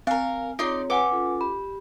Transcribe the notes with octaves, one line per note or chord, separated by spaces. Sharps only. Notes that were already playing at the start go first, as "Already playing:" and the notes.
C4 A#4 F5 G#5
C4 D#4 F4 G#4 C#5 D5 C6
B4 F#5 G#5 D6
C#4 F4 A4
G4 B5